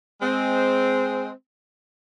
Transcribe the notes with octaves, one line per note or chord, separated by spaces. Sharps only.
G#3 C4